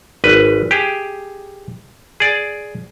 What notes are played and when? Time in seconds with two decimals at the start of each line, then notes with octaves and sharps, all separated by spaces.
0.24 G#1 B4
0.71 G4 G#4
2.20 G#4 D5